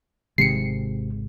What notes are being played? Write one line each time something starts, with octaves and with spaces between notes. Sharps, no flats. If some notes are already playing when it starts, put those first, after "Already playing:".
G#1 C3 D#3 G#3 C7 C#7